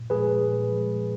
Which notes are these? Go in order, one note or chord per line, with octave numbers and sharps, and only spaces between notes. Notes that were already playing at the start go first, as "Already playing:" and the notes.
Already playing: A#2
F3 G#3 G#4 B4
A#2
F3 G#3